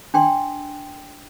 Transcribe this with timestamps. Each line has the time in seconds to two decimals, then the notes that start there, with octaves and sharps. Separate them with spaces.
0.14 D4 G5 C6